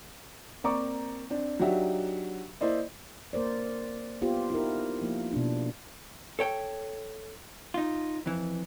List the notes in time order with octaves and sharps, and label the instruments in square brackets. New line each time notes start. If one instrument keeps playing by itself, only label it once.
[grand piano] A#3 C4 D5 A#5 C#6 D6
C4 D4
F#3 D4 D#4 F#4 G4 E5
A#3 E4 C5 D5 D#5
[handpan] A#3 A#4 C5 D5
B3 F4 G4 C5
D#4 E4 A#4
F3 A#3 F4
B2 D4
[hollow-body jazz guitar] A4 C#5 G5
D#4 F4
F2 E3